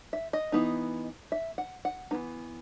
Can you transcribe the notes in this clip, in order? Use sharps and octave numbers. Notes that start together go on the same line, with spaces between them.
E5
D#5
E3 B3 D#4
E5
F#5
F#5
E3 B3 D#4